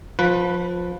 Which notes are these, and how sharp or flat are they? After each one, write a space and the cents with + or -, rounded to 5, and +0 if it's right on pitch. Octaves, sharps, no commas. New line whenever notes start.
F3 +20 B4 +0